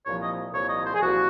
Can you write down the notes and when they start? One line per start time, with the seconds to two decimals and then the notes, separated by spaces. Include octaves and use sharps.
0.04 C2 A#2 F3 C#5
0.20 D#5
0.52 C2 A#2 F3 C#5
0.69 D#5
0.85 C5
0.94 G#4
1.01 C2 A#2 F3 F#4